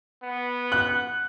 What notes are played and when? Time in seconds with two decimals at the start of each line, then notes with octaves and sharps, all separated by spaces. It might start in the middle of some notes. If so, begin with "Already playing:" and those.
0.23 B3
0.72 F#6